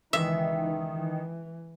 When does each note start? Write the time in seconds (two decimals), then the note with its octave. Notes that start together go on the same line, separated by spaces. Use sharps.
0.13 C#2 D#3 E3 E5
0.96 E3